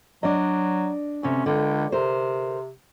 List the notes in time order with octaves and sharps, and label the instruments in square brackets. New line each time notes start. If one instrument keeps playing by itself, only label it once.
[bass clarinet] F#3 [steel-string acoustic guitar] D4 D#5
[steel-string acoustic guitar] D2 C3 [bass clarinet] C#4
[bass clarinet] C#2 [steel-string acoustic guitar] D3
[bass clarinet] C3 [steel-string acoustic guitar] A#4 C5